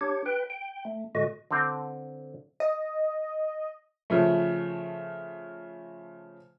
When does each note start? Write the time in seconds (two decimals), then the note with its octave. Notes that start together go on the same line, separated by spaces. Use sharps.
0.01 D4 G4 C#5
0.26 B4 G5
0.50 G5
0.85 A3
1.15 A2 D3 G#3 F#4 D#5
1.51 D3 C4
2.60 D#5
4.10 C#3 F3 A3